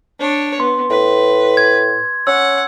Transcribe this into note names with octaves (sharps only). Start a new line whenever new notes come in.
D4 C#5
B3 C6
A2 B4
G#6
C#4 F#5 E6